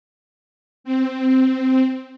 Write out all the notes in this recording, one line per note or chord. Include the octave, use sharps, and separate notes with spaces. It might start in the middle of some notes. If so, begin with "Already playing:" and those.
C4